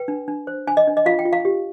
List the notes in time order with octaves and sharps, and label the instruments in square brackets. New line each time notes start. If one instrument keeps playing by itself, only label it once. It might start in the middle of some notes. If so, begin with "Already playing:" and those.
Already playing: [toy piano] B4 G5
D4
D4
C5
D4 G#5
D#5
D4
D#5
F4 F5
G5
F4
F5
G4